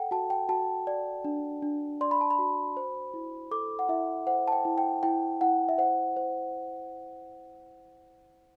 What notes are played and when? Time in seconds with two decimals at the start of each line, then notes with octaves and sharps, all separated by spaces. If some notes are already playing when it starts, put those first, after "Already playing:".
Already playing: A4 F#5 G5
0.11 F#4 A5
0.30 G5
0.49 F#4 A5
0.87 D5
1.25 D4
1.62 D4
2.01 D5 C6
2.11 B5
2.21 A5
2.30 B5
2.39 F#4
2.77 C5
3.14 E4
3.51 A4 D6
3.79 F#5
3.89 E4 E5
4.27 C5 F#5
4.48 A5
4.52 G5
4.65 E4
4.78 G5
5.03 E4 G5
5.41 E4 F#5
5.69 E5
5.78 C5 F#5
6.16 C5